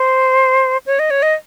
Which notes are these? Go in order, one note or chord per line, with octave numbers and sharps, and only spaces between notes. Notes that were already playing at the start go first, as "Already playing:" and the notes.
Already playing: C5
C#5
D#5
C#5
D#5